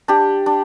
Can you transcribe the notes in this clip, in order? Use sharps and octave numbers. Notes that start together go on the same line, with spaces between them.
D4 G4
D4